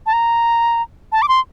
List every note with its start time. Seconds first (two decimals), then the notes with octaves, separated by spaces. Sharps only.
0.06 A5
0.13 A#5
1.12 A5
1.22 D6
1.29 C6